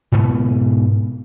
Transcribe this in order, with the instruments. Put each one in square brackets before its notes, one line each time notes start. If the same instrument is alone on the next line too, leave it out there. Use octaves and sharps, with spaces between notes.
[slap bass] G#2 B2 B3